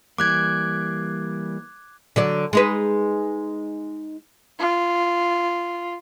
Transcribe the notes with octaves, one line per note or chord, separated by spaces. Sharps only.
E3 G3 A#3 D6 F#6 G#6
D3 F#3 D5
G#3 D#4 B4
F4